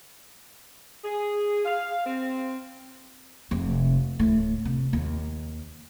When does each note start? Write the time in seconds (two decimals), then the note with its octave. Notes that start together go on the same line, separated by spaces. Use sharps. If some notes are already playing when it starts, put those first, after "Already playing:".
1.04 G#4
1.65 F5
2.05 C4
3.51 F1 C3
4.19 D1 A2
4.65 C3
4.93 D#2